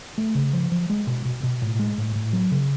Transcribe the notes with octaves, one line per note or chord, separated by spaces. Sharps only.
A3
C#3
F3
F3
G#3
B2
B2
B2
A2
G#3
A2
A2
F#3
C#3